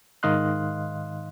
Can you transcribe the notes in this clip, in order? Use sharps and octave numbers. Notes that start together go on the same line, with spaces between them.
G#2 D#3 D#5 F5 C6 F#6